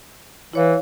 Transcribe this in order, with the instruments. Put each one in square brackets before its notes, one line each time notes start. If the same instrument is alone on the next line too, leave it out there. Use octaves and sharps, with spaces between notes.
[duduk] E3 [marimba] E4 C#5 F5